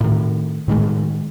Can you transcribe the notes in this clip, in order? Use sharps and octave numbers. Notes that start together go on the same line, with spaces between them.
A2 D#3
A2 D#3 G#3